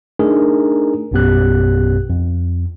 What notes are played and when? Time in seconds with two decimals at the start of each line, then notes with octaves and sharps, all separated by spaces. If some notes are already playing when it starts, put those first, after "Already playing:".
0.19 A3 D4 D#4 G#4 A#4
1.11 A#1 F#2 B2 B3 G4 F#6
2.10 F2